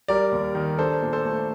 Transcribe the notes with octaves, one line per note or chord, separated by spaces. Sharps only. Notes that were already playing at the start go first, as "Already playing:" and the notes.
G3 A#4 D5
D#2
D#3
D4 A4 C5
A#2
A4 C5
A3